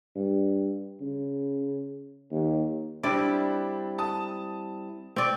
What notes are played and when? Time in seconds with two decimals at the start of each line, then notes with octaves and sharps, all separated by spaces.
0.16 G2
1.00 C#3
2.31 D#2
3.03 G3 C4 D4 E4 D5
3.98 A5 D#6
5.16 C4 D5